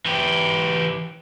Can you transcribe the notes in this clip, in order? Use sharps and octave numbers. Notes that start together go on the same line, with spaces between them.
E3 G4